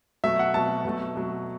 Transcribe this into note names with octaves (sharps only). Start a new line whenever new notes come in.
B2 F#3 A3 E5
F#5
B2 F#3 A3 A5
B2 F#3 A3
B2 F#3 A3